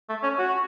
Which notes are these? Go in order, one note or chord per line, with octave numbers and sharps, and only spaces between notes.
A3
C#4
F#4